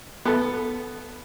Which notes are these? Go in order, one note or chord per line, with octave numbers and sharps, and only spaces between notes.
B3 A4